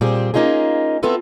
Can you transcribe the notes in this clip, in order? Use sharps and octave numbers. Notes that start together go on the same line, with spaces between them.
A#2 G3 C4 G#4
A#3 C#4 D#4 F4 G#4
B3 C4 E4 F4 A4 B4